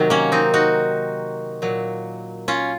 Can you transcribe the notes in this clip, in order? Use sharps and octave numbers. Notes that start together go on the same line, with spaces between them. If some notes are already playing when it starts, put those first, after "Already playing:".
Already playing: C3 D#3 F#3
A#3 C#4
C4 D#4
D#4 F#4
A#2 F#3
C#4 F4